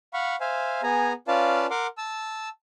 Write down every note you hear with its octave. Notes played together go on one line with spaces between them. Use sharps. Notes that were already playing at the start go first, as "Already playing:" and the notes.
F5 F#5 B5 C#6
C5 E5 F5 G#5
B3 G#4 G#5 A#5
C#4 F4 B4 D5 F5 A5
A#4 F#5 C6 D6
A5 E6